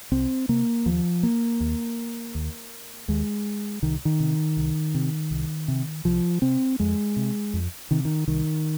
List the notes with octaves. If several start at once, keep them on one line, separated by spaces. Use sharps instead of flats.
C2 C4
C3 A#3
D#2 F3
A#3
D#2
D#2
D#2 G#3
C2 D#3
D#3
C3
C2
C3
C2
C3
C2 F3
C3 C4
F2 G#3
C3
F2
C3 D#3
D#3
C2 D#3